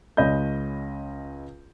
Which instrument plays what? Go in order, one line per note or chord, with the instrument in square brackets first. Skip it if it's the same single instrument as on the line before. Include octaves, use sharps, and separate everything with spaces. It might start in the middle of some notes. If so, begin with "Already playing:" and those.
[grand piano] C#2 C#4 D#5 B5 G6